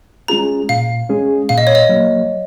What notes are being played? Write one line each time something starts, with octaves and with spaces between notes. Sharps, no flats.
G#3 C#4 F4 G#4 A#5
A#2 F5
G#3 C#4 G#4
A#2 F5
D#5
C#5
D#5
F#3 A#3